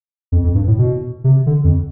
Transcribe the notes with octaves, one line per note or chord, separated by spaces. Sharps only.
F2
F2
G2
A2
B2
C3
D3
F2